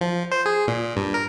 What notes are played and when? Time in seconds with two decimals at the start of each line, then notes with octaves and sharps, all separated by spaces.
0.01 F3
0.32 C5
0.46 G#4
0.68 A#2
0.97 G2
1.14 A#4